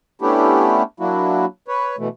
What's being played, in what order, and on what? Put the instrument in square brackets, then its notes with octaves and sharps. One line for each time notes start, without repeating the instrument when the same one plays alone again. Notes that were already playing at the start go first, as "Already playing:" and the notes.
[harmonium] A3 B3 C#4 D4 E4 G4
F#3 A#3 D4 E4 F#4
B4 C#5
B2 E3 A3